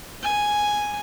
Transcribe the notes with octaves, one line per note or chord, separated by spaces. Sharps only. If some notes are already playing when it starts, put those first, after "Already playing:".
G#5